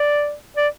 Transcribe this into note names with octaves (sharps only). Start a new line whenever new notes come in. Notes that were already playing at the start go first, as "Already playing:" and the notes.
Already playing: D5
D5